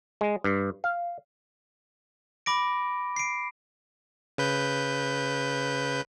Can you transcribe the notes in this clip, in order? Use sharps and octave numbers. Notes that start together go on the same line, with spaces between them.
G#3
G2
F5
B5 D6 A#6 D7
C7 D7
C#3 B4 G6